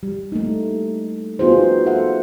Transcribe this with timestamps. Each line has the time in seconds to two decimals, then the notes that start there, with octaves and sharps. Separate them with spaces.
0.03 G3
0.32 A3 A#3 D#4
1.39 B3 D#4 F4 F#4 G#4 C5
1.86 A4 E5 F#5